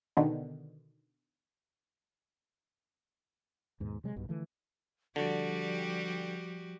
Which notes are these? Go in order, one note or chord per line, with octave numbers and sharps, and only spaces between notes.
B2 D3 D#3
D#2 G#2 B2
C3 F#3 G#3
B1 G2 B2
D3 E3 F3 A3
D3 F3 G3 F#4 G4